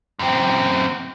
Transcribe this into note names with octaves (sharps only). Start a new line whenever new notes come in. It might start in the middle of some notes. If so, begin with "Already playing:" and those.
F#2 C4